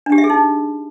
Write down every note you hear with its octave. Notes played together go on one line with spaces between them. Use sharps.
D4
G4
E5
G#4
D#4